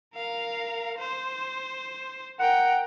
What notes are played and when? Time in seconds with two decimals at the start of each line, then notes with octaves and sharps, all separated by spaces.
0.15 A#4 F5
0.99 C5
2.39 A#4 F#5 G5